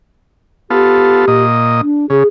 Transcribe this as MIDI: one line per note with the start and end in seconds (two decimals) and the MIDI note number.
0.70 1.25 59
0.70 1.25 65
0.70 1.43 67
0.70 1.25 69
1.28 1.81 46
1.28 1.81 75
1.81 2.06 62
2.10 2.23 49
2.10 2.27 68